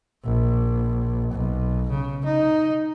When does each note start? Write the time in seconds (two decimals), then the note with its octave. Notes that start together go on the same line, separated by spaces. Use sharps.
0.24 A#1
1.32 B1
1.90 C#3
2.25 D#4